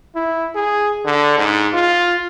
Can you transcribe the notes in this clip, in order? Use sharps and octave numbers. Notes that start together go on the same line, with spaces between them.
E4
G#4
D3
G#2
F4